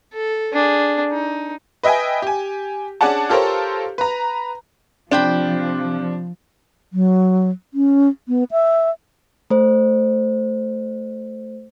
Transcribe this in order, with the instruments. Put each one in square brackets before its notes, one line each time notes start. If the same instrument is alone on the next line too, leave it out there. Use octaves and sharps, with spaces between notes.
[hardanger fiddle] A4
D4 G#4
D#4
[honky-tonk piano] B4 D#5 E5 G5 G#5
G4 G#5
C#4 D4 G#4 D5 F#5 A5
F4 G4 A4 A#4 C5 C#5
B4 A#5
[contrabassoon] C3 [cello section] F3 [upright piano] D4 [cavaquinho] C5 G5 B5
[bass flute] F#3
C#4
B3
E5
[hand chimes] A3 C5